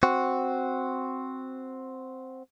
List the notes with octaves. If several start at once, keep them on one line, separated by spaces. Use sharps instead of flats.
C4 F#4